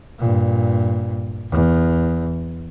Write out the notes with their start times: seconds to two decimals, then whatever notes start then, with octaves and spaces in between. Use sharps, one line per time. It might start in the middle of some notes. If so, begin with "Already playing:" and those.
0.19 G2 A#2
1.50 E2